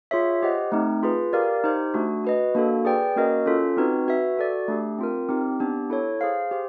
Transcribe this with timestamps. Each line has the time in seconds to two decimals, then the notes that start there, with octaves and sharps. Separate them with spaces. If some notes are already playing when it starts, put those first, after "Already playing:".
0.11 F4 G#4 C#5 E5
0.42 G4 C5 D#5 F#5
0.72 A3 C4 D#4
1.03 F4 G#4 B4
1.33 G4 A#4 D5 F5
1.64 D#4 G4 C5
1.94 A3 D4 F#4
2.24 F#4 B4 D#5
2.55 A#3 D4 F#4 A4
2.85 G#4 B4 D5 G5
3.16 A#3 C#4 F#4 A#4 D#5
3.46 C#4 F4 A4
3.77 C4 D#4 F#4 B4
4.08 F#4 B4 E5
4.38 F#4 A4 D5
4.68 A3 D4 G4
4.99 C4 F4 A#4
5.29 C4 D#4 G4
5.60 B3 D4 G4
5.90 E4 A4 C#5
6.21 G#4 C5 F5
6.51 G4 C5